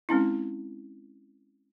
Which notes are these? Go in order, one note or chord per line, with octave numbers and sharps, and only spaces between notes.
G#3 C4 C#4 E4